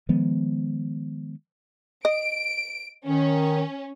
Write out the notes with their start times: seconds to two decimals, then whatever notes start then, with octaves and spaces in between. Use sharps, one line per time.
0.09 D#3 F3 G#3 B3
2.05 D#5 D7
3.06 D#3 C#4